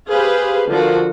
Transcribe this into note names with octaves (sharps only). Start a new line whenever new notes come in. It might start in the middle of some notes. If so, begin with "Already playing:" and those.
G4 G#4 B4 C5 F5
D3 F3 F4 F#4 A#4